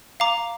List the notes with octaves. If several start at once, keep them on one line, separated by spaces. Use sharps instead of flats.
F5 A#5 D6